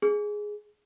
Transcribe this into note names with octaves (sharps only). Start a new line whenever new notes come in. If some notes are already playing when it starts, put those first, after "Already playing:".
G#4